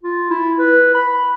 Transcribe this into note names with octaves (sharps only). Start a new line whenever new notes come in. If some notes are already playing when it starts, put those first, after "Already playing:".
F4
E4
B4
B5